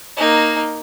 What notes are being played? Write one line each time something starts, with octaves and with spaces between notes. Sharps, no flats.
A#3 D#4